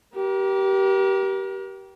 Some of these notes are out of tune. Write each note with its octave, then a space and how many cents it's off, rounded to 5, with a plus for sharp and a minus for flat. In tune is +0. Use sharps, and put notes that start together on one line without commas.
G4 -20 A#4 +35